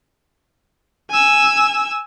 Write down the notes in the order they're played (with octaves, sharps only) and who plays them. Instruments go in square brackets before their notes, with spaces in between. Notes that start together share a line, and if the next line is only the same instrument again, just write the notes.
[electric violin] G#5 E6